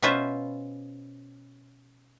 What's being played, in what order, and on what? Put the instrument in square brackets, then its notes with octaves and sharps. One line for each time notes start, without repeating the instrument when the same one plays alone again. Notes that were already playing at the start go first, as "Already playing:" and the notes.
[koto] B2 C#4 F4 B4 C5 E5